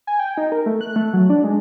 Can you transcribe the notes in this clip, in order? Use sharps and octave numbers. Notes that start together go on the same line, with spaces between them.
G#5
G5
D#4
A#4
A3
F#6
A3
F#3
D4
G#3